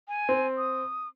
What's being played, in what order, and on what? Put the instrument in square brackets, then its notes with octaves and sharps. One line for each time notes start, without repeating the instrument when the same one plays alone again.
[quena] G#5
[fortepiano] C4
[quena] D#6